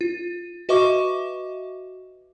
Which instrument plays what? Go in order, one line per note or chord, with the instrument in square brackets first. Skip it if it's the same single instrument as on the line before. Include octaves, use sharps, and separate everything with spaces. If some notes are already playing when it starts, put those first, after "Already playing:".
[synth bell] F4
F#4 B4 D#5 E5 C#6 D6